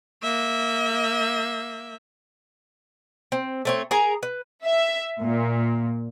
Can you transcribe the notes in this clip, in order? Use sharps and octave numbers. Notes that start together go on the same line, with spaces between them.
A#3 E5
C4
A3 C4 C#5
G#4 A#4 G#5 A#5
B4
E5
A#2